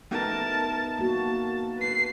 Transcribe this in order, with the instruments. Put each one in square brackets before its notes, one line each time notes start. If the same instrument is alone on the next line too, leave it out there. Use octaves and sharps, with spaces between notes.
[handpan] A3 B3 D#4 [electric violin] A#4 A5
[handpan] A#3 F#4 [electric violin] A5
[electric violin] B4 C7